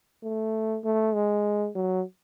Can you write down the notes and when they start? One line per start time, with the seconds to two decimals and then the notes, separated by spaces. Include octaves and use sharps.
0.23 A3
0.84 A3
1.14 G#3
1.75 F#3